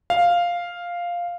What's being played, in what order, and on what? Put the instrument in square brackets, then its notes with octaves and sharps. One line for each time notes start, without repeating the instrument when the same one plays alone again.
[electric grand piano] F5